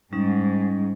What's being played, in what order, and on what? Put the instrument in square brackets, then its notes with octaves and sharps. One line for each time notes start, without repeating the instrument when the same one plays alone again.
[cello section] G#2 [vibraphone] G3 C#4 D#4